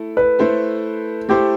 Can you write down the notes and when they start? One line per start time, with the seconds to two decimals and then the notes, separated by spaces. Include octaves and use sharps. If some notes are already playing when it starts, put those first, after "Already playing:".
Already playing: A3 E4 A4
0.17 B4
0.39 A3 E4 A4 C5
1.29 A3 E4 G4 A4 C5